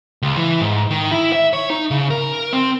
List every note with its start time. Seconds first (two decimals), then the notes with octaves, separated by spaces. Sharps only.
0.22 C#2
0.36 E3
0.61 G#2
0.90 D#3
1.12 E4
1.33 E5
1.53 C#5
1.70 D#4
1.91 C#3
2.10 A#4
2.53 C4